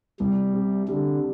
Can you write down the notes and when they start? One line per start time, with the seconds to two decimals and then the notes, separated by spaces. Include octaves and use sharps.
0.20 C2 G3
0.54 C3
0.89 D3 G3